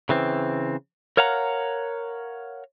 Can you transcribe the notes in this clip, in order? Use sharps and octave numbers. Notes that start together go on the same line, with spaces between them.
C#3 E3 C4
A#4 C#5 F5 F#5 A#5